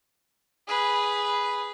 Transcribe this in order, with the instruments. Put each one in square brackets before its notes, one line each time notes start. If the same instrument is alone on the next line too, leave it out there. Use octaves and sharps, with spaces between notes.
[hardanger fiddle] G#4 B4